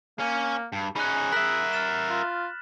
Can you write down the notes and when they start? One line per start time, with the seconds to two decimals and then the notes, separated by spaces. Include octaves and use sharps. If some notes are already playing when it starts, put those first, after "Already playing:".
0.19 A#3 C#4
0.73 G2
0.96 C#4 D#4 G#4 B5 F#6
1.32 A#4 E5 F#6 B6 F#7
1.73 F6 A6 E7
2.10 F4